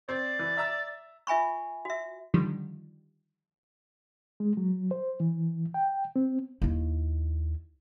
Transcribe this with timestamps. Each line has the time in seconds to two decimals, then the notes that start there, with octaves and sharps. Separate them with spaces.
0.09 C4 C5 D5
0.39 E3
0.57 E5 A#5 E6
1.27 F4 E5 G#5 B5 C#6
1.85 F#4 E5
2.34 D3 D#3 F3 G3
4.40 G#3
4.57 F#3
4.91 C5
5.20 E3
5.74 G5
6.16 C4
6.62 D#2 E4